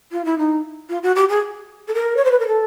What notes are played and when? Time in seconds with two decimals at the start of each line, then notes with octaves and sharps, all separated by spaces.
0.12 F4
0.24 E4
0.38 D#4
0.89 F4
1.03 F#4
1.15 G4
1.29 G#4
1.88 A4
1.94 A#4
2.16 C#5
2.24 C5
2.31 B4
2.39 A#4
2.47 A4